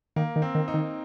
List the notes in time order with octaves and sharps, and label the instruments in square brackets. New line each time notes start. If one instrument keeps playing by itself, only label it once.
[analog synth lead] D#3 [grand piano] A#3
[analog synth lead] D#3
[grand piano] C4
[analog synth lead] D#3
[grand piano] D#4
[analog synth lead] D#3